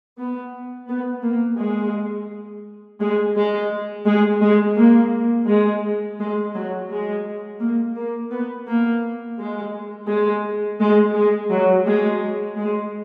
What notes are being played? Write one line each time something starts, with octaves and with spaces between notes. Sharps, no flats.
B3
B3
A#3
G#3
G#3
G#3
G#3
G#3
A#3
G#3
G#3
F#3
G#3
A#3
A#3
B3
A#3
G#3
G#3
G#3
G#3
F#3
G#3
G#3